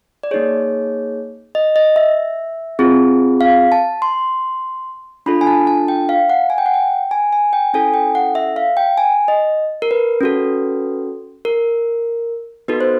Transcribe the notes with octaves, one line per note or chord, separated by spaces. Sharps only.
D5
A#3 D#4 G#4 C#5
D#5
D#5
E5
C4 F4 G#4
F5
A5
C6
D4 F4 A4 B5
G#5
A5
A5
G5
F5
F#5
G#5
G5
F#5
G5
G#5
G#5
G5
C#4 E4 A4 G#5
G5
F#5
E5
F5
G5
G#5
D#5
A#4
B4
C#4 F#4 A4
A#4
B3 D#4 F#4 A4 B4
C5